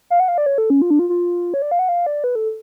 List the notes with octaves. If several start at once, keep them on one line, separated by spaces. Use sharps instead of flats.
F5
F#5
F5
D5
C#5
A4
C#4
F4
D4
F4
F4
C#5
D5
F5
F#5
F5
D5
B4
A4